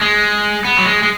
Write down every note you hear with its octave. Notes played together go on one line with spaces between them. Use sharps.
G#3
B3
F#3
G#3
G#3